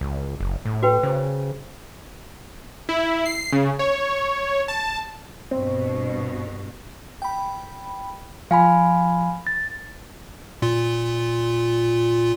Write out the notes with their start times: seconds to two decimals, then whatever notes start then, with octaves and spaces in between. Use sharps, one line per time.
0.01 C#2
0.40 F#1
0.65 A2
0.83 F#4 B4 G5
1.03 C#3 C5
2.89 E4
3.26 C7
3.53 C#3
3.79 C#5
4.68 A5
5.51 G2 B2 C4
7.22 G5 B5
8.51 F3 F5 G#5 B5
9.47 A6
10.62 A#2 F4